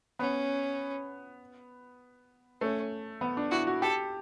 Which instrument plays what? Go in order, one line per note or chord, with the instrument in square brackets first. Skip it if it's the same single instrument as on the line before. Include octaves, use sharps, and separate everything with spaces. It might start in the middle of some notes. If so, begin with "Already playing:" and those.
[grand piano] B3 [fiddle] C#4
[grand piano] A3 [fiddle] C#4
[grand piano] B3
D4
[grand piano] E4 [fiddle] F#4
[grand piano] F#4
[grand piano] G4 [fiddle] A4